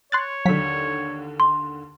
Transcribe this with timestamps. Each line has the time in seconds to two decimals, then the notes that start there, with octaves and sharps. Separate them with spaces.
0.12 C#5 C6 F#6 A6
0.46 D#2 D3 F#3 B6
1.40 C6